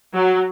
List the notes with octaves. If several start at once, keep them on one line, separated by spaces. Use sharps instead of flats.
F#3